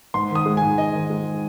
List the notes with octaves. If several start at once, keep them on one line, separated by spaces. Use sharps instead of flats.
G#2 C6
D#3 D#6
G#3
G#5
G#2
G#2 D#5
D#3
G#3